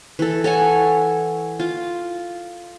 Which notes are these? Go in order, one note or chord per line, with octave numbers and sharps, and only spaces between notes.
E3 A4
A4 C#5 F#5 G#5
F4